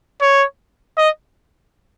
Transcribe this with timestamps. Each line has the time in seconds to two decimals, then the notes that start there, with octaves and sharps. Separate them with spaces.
0.22 C#5
0.98 D#5